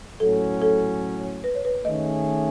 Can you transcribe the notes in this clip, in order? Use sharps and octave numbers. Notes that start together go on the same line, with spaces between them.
A2 F#3 C#4 A4
A4
B4
C#5
B4
D#3 A3 C#4 G#4 D#5